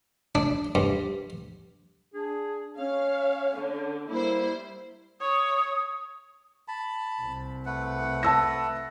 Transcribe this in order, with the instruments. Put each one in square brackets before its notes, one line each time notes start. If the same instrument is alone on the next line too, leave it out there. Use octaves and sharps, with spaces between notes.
[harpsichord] D4
G2
[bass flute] D4 [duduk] G#4
[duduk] C#4 [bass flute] C#5 [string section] F5
[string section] D3
[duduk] G3 [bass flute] A#3 [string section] E4 C5
[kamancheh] C#5 [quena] D#6
[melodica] A5 B5
[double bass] C2
[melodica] A3 B4 F#5
[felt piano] A5 E6 A#6